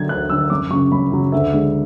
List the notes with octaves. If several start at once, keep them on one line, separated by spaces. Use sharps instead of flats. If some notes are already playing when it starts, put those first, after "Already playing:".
Already playing: D3 F#3 G#6
D2 F#6
D3 F#3 E6
F#2 D6
C#3 F#3 C#6
F#2 B5
C#3 F#3
D2 E5
D3 G#3